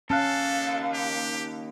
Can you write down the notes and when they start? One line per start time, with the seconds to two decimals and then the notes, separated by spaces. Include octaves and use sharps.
0.10 D#2 C#4 A4 F5 A5 F6 F#6
0.93 G4